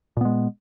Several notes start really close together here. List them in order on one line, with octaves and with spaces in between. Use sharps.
A#2 B3 G#3